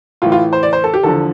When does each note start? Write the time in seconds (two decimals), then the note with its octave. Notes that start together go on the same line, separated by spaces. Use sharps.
0.22 A2 E3 F4
0.32 F4
0.53 C5
0.63 D5
0.73 C5
0.84 A4
0.94 G4
1.03 E2 D3 F3 A4